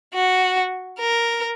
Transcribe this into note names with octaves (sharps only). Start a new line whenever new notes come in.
F#4
A#4